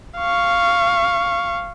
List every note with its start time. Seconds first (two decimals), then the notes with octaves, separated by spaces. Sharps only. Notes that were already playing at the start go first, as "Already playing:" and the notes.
0.18 F5 C#6